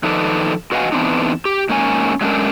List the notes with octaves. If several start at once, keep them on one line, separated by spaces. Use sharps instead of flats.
D#3 F3 D#4 A4 B4 D5
F#4 B4 D#5 F5 F#5 G#5
E3 F3 B3 C4 D4 D#4
G4
G#2 A#3 C#4 G#5
F#3 G#3 A3 C#4 D4 A#4